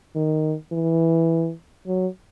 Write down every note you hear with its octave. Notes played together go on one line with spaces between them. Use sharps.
D#3
E3
F#3